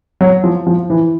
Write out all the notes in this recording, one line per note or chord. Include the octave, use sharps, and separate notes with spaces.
F#3
F3
F3
E3